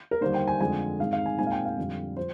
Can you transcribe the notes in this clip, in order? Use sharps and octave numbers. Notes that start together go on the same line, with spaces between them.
A#4
D#2 D3 G3 D4 C5
G5
G#5
F2 D3 G#3 G#5
G#2 D#3 G#3 C4 F5
F5
G#5
A#2 G#3 C4 D#4 G#5
F5
G5
F5
F2 D3 G3
F3 C5